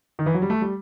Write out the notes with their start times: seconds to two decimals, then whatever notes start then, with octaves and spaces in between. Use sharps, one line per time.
0.19 D#3
0.26 E3
0.34 F#3
0.42 G3
0.50 A3
0.62 G3